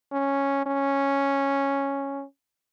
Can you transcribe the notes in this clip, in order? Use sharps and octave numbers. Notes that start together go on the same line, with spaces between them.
C#4
C#4